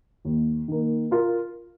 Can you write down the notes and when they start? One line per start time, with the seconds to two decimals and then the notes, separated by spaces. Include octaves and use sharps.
0.25 D#2
0.68 D#3 A#3
1.11 F4 A#4